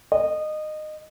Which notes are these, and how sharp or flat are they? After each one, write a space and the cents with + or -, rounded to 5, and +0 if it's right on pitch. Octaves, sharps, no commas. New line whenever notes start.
D#5 -20